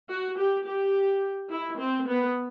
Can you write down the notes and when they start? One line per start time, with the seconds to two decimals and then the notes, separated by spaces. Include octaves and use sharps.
0.09 F#4
0.37 G4
0.65 G4
1.50 E4
1.78 C4
2.06 B3